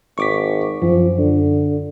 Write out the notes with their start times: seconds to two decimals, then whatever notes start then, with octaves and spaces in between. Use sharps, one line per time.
0.18 G#1 C#6 D6 B6
0.82 F#2 F3
1.18 D3